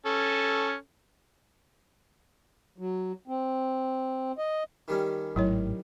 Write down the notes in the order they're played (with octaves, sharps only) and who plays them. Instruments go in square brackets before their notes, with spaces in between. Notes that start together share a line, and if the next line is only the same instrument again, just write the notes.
[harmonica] C#4 A4
[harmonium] F#3
C4
D#5
[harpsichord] D#3 G3 C#4
[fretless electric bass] G#1 A2 [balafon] F#3 E4 C#5